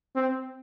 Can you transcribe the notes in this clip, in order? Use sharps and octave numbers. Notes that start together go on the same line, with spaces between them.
C4